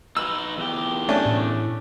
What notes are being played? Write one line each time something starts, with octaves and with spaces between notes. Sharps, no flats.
D#4 B4 E6
E2 G4
A3 C#4 D4
A2